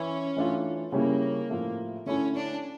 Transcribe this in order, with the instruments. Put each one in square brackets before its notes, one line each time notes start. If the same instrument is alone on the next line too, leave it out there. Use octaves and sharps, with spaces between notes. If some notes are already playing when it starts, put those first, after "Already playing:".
Already playing: [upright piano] E3 E4 [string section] C#4
[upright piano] E3 A3 D4 F4
[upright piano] C#3 G3 C#4 E4 [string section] A#3
[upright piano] A2 F3 A3
[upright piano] D3 A3 E4 [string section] C#4
[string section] D4